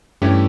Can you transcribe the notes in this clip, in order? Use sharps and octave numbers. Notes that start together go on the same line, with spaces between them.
G2 E3 A3 C#4 E4 G4